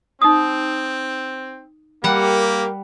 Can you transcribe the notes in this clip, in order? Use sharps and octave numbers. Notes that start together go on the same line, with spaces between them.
C4 D#4 D#6
G3 A#3 G4 A#4 F#5